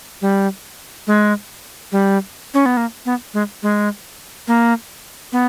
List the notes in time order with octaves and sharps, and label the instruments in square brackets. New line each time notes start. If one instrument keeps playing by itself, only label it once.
[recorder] G3
G#3
G3
C#4
B3
A#3
B3
G#3
G#3
A#3
B3